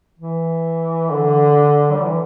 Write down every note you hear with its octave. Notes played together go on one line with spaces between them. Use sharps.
E3
D3
G3
E3